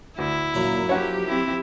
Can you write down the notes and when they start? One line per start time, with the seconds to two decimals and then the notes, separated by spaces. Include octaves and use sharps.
0.18 D2 E4
0.54 F#2 A#2 F#3 A#3
0.89 F3 G4 C#5 E5 F#5
1.28 C4 E4